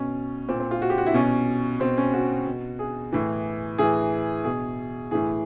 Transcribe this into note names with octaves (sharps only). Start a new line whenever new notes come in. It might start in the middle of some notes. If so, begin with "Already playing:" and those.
Already playing: B2 C#4
A#2 C4
C4
F4
F#4
G4
F#4
E4
B2 C#4
B2 C4
C#4
F#4
B2
G#4
A2 E3
A2 E3 G#4
B2 G#4
A2 E3 G#4